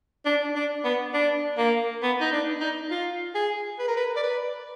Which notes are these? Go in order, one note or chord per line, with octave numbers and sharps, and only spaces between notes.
D4
D4
B3
D4
A#3
B3
D#4
D4
D#4
F4
G#4
B4
A#4
B4
D5
B4